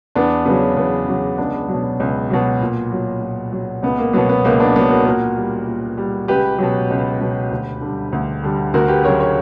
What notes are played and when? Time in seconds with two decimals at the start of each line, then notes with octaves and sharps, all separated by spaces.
0.15 E2 B3 D4
0.45 C#3 F#3 B3
0.77 E2 B3
1.07 C#3 F#3
1.38 C#2 B3 D4
1.68 B2 F#3
2.00 C#2
2.30 B2 F#3
2.61 A#2
2.92 F#3
3.21 A#2
3.52 F#3
3.83 C#2 B3
3.98 A#3
4.13 B2 F#3 B3
4.29 B3
4.45 C#2 A#3 C#4
4.60 B3 D4
4.76 B2 F#3 B3
4.90 F#4 A#4
5.05 A#2 F#4 A#4
5.37 G3
5.66 A#2
5.97 G3
6.28 C#2 G4 B4
6.58 B2 F#3
6.90 C#2
7.20 B2 F#3
7.51 D2
7.81 D3 G3
8.12 D2
8.43 D3 G3
8.74 D2 F#4 A#4
8.88 G4 B4
9.04 C#3 F#3 A#4 C#5
9.19 A#4 C#5